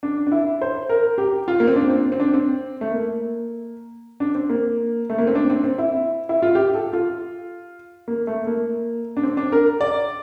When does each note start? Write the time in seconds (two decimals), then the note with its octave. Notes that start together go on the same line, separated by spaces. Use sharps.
0.03 D4
0.27 D4
0.32 E4
0.62 C5
0.89 A#4
1.18 G4
1.48 F4
1.60 A#3
1.68 C4
1.76 D4
1.90 C4
2.12 C4
2.20 D4
2.34 C4
2.81 A3
2.91 A#3
4.20 D4
4.35 C4
4.50 A#3
5.10 A3
5.18 A#3
5.27 C4
5.35 D4
5.50 C4
5.64 C4
5.78 E4
6.29 E4
6.42 F4
6.55 G4
6.75 A4
6.93 F4
8.08 A#3
8.27 A3
8.47 A#3
9.17 D4
9.23 C4
9.37 D4
9.52 A#4
9.81 D5